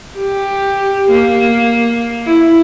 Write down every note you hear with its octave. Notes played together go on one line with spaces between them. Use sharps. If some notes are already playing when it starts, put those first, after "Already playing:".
G4
A#3
E4